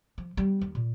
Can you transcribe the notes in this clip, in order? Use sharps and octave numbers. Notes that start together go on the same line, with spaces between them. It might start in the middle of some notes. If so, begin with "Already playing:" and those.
F3
G3 B3
D#2
A#2